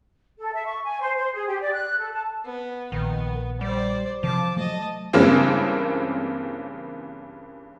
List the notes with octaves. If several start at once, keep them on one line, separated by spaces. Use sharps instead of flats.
A4
E5
C#6
G#5
C5
C5
G#4
G4
D5
F#6
A4
A5
B3
A#1 D#3 B3
G3 C5 D5
C3 E3 F3 A5 D6
F#3 A3 D#5 A5
G2 C#3 E3 G#3 A#3 C4